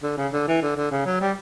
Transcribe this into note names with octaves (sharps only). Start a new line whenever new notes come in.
D3
C#3
D3
E3
D3
D3
C#3
F#3
G3